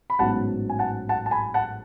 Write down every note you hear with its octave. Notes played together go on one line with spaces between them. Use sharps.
B5
A1 G#2 F#3 B3 F#5 A5
G#5
F#5 A5
F#5 A5
A5
G#5 B5
F#5 A5